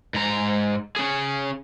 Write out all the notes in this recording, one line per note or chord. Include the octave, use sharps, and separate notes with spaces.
G#2 A#5
C#4 G#4